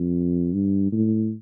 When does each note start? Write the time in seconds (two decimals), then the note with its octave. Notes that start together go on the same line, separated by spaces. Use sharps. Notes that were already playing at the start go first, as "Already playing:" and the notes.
Already playing: F2
0.54 G2
0.92 A2